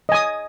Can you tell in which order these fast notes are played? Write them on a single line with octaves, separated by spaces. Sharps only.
D#5 G#5 D#6